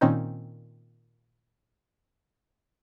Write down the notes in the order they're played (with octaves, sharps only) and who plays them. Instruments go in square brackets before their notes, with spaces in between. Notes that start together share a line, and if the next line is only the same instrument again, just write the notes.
[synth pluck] A#2 D#3 C4 C#4 D#4